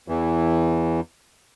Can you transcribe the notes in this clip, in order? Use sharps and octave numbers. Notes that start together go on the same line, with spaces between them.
E2 E3